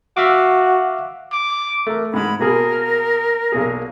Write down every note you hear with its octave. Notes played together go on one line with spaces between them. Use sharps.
F#4 E5 F5 D6
D6
A3 A#4
G#2 G#3 B5
B2 A#3 G#4 A#4
B1 A#2 G#4